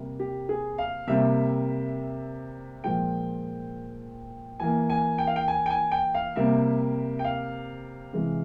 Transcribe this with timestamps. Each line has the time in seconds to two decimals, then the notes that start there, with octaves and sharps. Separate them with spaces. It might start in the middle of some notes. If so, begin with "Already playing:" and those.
Already playing: C3 G3 A#3
0.20 G4
0.49 G#4
0.78 F5
1.07 C3 G3 A#3 E5
2.84 A#2 F3 G#3 G5
4.60 E3 A#3 G#5
4.90 G#5
5.18 G5
5.27 F5
5.36 G5
5.48 G#5
5.66 G5
5.70 G#5
5.92 G5
6.14 F5
6.36 C3 G3 A#3 E5
7.19 G5
7.24 F5
8.13 C3 E3 G#3